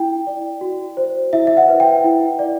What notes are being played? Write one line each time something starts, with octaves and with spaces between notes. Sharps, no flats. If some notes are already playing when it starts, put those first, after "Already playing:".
Already playing: E4 G5
D5
F#4
C5
E4 E5
E5
F#5
B4
G5
E4
D5